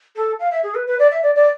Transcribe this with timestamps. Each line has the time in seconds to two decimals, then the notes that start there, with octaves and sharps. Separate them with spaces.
0.16 A4
0.39 F5
0.51 E5
0.63 G#4
0.75 B4
0.87 B4
0.99 D5
1.11 E5
1.23 D5
1.35 D5